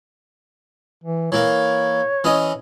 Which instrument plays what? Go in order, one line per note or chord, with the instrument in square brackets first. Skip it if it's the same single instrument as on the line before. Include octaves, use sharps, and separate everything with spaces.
[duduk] E3
[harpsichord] E3 A#3 [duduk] C#5
[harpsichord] E3 C#4 D#5